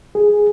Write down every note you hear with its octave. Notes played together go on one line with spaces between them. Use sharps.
G#4